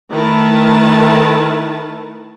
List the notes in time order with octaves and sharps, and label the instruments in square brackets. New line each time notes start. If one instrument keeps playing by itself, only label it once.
[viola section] D#3 A3 E4 A#4 B4 A5